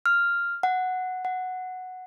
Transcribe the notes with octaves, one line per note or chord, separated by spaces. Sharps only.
F6
F#5
F#5